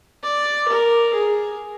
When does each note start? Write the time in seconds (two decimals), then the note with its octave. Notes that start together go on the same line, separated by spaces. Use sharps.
0.23 D5
0.68 A#4
1.13 G#4